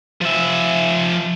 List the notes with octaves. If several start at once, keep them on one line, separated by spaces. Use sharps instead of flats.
F3 E5